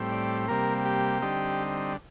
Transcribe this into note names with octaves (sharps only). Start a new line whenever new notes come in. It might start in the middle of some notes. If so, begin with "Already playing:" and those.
Already playing: A2 G3 C4
D5
C3 G3 A#3 A#4
G4
D3 G3 C4 D#4